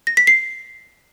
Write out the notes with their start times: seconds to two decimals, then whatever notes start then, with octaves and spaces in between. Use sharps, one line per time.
0.07 A#6
0.17 B6
0.27 C7